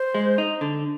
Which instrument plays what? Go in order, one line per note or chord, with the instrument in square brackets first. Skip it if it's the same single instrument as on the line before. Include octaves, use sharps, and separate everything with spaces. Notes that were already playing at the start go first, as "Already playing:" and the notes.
Already playing: [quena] C5
[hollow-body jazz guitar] G#3
D#4
D3